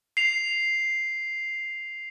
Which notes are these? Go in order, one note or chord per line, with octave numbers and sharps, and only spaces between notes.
C7 F7